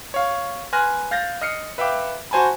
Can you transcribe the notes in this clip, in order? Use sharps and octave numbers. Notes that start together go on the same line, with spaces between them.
C#5 F5
B4 G#5 C6 F6 F#6 A#6
F5 G6 A6 A#6
D#5 F6 C7 C#7
B4 E5 F5 G5 D6
F#4 C5 G#5 A5 B5